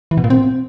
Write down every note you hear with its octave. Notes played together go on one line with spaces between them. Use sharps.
E3
B2
A#2
C4